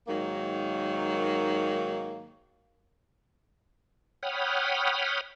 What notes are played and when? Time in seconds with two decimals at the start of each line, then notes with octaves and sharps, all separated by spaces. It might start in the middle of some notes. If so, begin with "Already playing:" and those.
0.08 G#2 D#3 F#3 A#3
4.23 C#5 F#5 G5 B5 D#6 F6